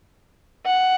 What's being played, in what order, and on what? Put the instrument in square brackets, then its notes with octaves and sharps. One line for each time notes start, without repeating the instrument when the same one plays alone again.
[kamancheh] F#5